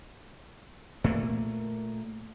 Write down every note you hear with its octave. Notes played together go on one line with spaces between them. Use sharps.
A#2 A3 A#3